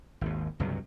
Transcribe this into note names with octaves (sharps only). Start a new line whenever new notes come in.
G#1 D#2
C#2 G2 C3 F#3